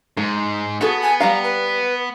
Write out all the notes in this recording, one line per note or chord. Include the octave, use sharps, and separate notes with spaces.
G#2 G#3
B3 F#4 G#4 A4
G#5
G3 F5 A#5
B4